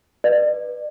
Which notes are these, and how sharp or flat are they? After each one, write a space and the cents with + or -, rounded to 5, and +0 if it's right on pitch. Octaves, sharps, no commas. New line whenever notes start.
B4 +0 D5 +40